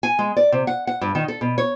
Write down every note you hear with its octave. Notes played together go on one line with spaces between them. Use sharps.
G#5
G#3
D5
C3
F#5
F#5
G2
D#3
A4
B2
C#5